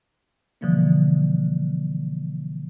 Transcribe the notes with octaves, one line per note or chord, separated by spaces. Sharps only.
B2 D3 E3 F3 G3 A#3